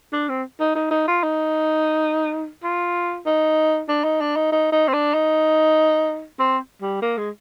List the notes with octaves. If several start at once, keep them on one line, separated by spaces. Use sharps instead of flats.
D4
C4
D#4
D#4
D#4
F4
D#4
F4
D#4
D4
D#4
D4
D#4
D#4
D#4
C4
D4
D#4
C4
G3
A#3
G#3